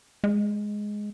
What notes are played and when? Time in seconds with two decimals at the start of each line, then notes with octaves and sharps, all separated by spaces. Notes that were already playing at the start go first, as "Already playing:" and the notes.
0.24 G#3